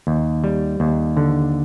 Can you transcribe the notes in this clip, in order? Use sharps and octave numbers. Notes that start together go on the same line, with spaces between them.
D#2
G3
D#2
D3